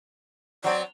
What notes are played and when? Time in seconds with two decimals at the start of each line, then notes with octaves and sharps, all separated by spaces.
0.64 F#3 C4 D5